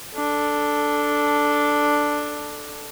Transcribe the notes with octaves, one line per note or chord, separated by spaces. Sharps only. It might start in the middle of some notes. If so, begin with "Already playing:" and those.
D4 A4